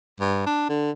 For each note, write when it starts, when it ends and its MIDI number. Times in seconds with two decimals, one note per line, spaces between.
0.20 0.44 43
0.47 0.67 62
0.69 0.91 50